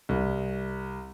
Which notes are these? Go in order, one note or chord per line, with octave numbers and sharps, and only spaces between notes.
C2